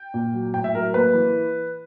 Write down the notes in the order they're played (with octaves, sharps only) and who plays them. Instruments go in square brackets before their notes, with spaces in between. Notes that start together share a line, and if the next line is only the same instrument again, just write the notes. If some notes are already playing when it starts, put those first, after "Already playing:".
Already playing: [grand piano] G5
A#2
F#3
A2 G5
E5
F#3 A#4
A#3 B4
E3